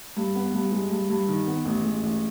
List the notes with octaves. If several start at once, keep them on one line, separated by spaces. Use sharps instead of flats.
G2
B3
G2
G#3
G2
G2
D#3
B3
A1
G#3
A1